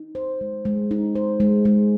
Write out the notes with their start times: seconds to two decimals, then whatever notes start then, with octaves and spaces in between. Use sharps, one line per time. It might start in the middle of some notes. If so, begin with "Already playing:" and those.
Already playing: D#4
0.15 C5
0.41 G#3
0.65 G#3
0.91 D#4
1.15 C5
1.40 G#3
1.65 G#3